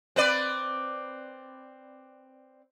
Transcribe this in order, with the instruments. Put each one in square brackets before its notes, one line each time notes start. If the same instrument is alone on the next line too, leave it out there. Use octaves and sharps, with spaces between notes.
[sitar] C4 B4 D5